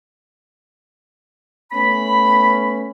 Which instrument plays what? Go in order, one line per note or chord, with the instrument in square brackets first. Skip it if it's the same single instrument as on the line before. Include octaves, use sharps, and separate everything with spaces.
[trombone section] A3 B3 C#4 [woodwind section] B5